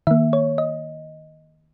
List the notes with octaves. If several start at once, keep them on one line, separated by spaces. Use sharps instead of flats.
D#3 A#3 E5
C#5
D#5